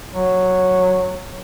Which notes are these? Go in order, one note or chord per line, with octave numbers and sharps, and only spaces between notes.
F#3